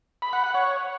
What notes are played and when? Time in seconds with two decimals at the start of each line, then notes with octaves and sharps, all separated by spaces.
0.22 B5
0.33 F#5
0.44 F#5
0.54 C#5